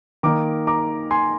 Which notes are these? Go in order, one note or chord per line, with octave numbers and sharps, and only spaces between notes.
D#3 A#3 D#4 A#5 D6
A#5 D6
G#5 C6